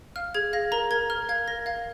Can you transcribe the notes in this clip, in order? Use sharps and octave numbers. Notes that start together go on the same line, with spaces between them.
F5 F6
G#4 G#6
F5 A#6
A#4 A#5
A#4 G#6
A#4 F6
F5 G#6
A#4 A#6
F5 G#6